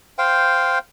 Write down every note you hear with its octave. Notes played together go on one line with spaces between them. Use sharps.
C5 F5 G5